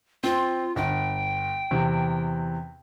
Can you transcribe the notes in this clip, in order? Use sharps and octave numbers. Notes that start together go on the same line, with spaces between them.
C4 F4
G1 G5
E2 C3